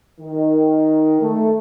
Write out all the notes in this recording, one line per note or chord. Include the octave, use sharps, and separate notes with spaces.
D#3
A3